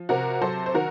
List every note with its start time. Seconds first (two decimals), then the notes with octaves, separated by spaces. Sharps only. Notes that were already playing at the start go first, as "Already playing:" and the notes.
Already playing: F3
0.09 C3 F#4 A#4
0.41 F#3 A4 C5
0.66 C5
0.74 D#3 F#4 A#4